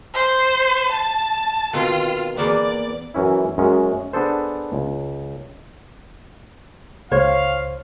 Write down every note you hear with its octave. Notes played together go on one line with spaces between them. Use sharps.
C5
A5
B2 D#3 C4 F4
E2 A#3 B3 D5
F#2 E3 C#4 E4
F#2 G#3 C#4
B3 D4 G#4 A4 C5
C#2
C#2 C5 C#5 F5